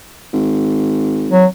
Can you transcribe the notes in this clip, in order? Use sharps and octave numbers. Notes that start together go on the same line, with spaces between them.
G#1
F#3